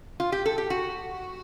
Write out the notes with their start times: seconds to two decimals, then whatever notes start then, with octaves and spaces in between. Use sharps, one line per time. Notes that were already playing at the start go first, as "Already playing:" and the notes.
0.20 F4
0.32 G4
0.46 A4
0.58 G4
0.70 F#4